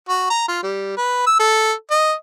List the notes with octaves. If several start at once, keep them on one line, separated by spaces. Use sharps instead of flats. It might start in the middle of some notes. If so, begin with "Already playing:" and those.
F#4
A#5
F4
G3
B4
E6
A4
D#5